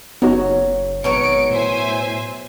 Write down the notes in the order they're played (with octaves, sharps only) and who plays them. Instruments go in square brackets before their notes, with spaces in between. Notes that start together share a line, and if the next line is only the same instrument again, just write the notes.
[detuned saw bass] F#1 [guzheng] F#3 [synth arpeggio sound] B3 D#4 F#4
[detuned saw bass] G#1 [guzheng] B2 F#3 C#5 [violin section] C#7 D7
[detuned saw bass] A2 [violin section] C5 E5 G#5